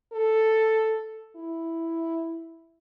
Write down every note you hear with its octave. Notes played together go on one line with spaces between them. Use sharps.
A4
E4